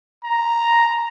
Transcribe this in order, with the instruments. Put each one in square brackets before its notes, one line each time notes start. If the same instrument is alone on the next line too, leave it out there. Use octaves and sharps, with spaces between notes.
[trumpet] A#5